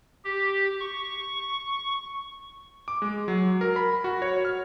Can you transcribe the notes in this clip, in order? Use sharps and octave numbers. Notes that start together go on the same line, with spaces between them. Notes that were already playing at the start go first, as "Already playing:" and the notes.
G4
C#6
D6
G#3
F#3
A#4
B5
F#4
C#5
F6